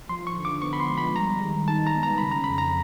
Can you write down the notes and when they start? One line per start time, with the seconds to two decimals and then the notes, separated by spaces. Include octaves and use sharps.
0.09 F3 C6
0.27 C#6
0.36 D3
0.45 D6
0.62 B3 C#6
0.73 B5
0.80 C6
0.89 G#3
0.98 B5
1.15 G3 A#5
1.42 D#3
1.68 D#4 A5
1.87 A#5
1.95 B3
2.03 A#5
2.18 C#3 B5
2.32 A#5
2.44 F2 B5
2.58 A#5